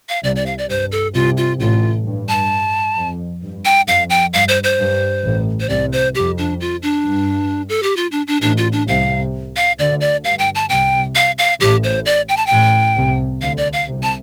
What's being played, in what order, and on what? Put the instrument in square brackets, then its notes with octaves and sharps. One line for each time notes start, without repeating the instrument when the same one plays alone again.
[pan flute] F5
[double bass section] C2 C3 [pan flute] D5
[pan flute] D5
F5
D5
[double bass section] G2 [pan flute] C5
[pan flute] A4
[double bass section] C2 C3 [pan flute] F4
[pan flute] F4
[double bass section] A1 A2 [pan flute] F4
[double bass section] G2
[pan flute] A5
[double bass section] F2
G2
[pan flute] G5
[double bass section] F2 [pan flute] F5
[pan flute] G5
[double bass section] G2 [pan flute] F5
[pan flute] C5
C5
[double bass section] G2
A1 A2
[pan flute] C5
[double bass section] C2 C3 [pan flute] D5
[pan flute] C5
[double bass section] F2 [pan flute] G4
[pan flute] D4
F4
D4
[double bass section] G2
[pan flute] A4
G4
F4
D4
D4
[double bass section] A1 A2 [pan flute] D4
[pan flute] F4
D4
[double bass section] C2 C3 [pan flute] F5
[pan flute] F5
[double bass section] D2 D3 [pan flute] D5
[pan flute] D5
[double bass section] G2 [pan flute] F5
[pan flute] G5
A5
[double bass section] C2 C3 [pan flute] G5
[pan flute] F5
F5
[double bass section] A1 A2 [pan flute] G4
[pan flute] C5
D5
G5
A5
[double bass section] A1 A2 [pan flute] G5
[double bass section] C2 C3
[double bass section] D2 D3 [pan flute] F5
[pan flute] D5
F5
[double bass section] C2 C3
[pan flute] A5